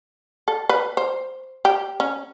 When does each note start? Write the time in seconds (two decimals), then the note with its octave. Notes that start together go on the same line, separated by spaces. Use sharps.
0.48 A4
0.69 B4
0.97 C5
1.65 G4
2.00 C#4